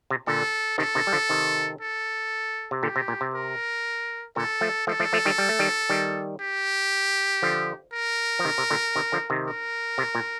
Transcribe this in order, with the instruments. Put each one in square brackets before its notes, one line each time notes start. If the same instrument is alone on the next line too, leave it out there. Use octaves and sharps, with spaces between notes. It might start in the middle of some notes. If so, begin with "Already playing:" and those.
[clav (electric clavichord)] C3
[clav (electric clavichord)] A#2 D3 [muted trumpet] A4
[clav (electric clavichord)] C3 D#3 [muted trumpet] A4
[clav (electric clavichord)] C3 D#3
G3
D3 F3
C3 D#3
[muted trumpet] A4
[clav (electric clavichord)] C3
[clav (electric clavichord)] A#2 D3 [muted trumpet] G4
[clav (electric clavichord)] C3
A#2
C3
[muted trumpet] A#4
[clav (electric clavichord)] A#2 D3 [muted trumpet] A4
[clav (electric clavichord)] F3 A3
[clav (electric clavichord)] F3 A3 [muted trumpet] A4
[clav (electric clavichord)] F3 A3
F3 A3
D#3 G3
G3
A3
D#3 G3
D#3 G3
[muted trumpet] G4
[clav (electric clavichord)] D3 F3
[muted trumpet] A#4
[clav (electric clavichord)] F3
C3 D#3
C3
A#2 D3
C3 D#3
D3 F3
C3 D#3
[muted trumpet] A#4
[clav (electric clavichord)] C3
A#2